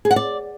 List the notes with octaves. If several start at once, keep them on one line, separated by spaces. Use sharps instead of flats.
G#4
F#5
D5